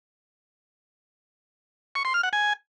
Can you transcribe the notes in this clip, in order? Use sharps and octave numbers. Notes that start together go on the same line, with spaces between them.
C#6
C6
F6
F#5
G#5